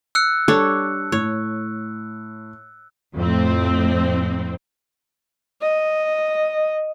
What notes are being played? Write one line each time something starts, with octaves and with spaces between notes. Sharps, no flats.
E6 F#6 C#7
G3 D4 A4 C#5
A2 C#5
F2 A2 C4
D#5